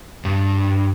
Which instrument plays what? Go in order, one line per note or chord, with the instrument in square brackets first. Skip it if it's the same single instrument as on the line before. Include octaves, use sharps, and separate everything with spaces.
[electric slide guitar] G2